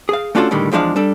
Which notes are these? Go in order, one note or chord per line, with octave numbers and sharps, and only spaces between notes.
G#4 F5
A3 C#4 D4 F4 F#4 A4
A2 D3 D#3 G3 G#3
E2 F3 G#3 D4 F5
G3 D4 A4